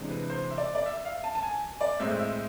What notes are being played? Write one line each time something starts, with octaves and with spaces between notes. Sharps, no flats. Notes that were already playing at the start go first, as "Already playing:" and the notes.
Already playing: C3 E3 G#3 D4
B4
C5
E5
D5
D5
E5
F5
A5
A5
G#5
D5
A2 G#3 C4 E5
E5